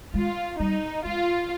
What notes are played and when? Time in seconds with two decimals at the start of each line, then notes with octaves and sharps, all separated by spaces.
0.14 G#3 F4
0.60 G3 D#4
1.05 G#3 F4